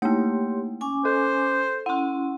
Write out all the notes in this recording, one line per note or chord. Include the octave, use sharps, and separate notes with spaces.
A3 A#3 G4 C#5 C6
C#4 G#5 D6
A4 C5
C#4 E4 F#5 C6